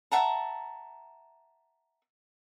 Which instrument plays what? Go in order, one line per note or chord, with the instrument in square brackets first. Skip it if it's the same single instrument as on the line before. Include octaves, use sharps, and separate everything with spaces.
[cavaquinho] E5 F#5 A5 A#5